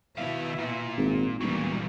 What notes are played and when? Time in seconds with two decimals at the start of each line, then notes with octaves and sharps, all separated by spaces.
0.18 B2 D#3 E4 E5 F5
0.59 A#2
0.98 G#1
1.41 E1 A#2 E3 F#3 G3 A#3